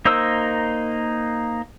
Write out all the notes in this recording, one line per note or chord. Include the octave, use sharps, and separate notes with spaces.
A#3 D#4 A#4 C5 E6